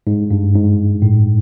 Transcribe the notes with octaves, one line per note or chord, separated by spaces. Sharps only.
G#2
G2
G#2
A2